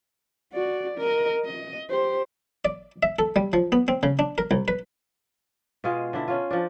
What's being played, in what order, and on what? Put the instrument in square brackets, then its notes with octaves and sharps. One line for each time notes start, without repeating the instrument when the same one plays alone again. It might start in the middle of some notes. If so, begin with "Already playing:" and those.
[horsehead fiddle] F#4 D5
A#4 D#5
D#5
G4 C5
[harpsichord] D5
E5
A4
G3
F3
B3
C4
C#3
D4
A#4
C2
B4
[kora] B2 G#3 F4 G#4
D3 D4 E4
C#4 F4
F3 D4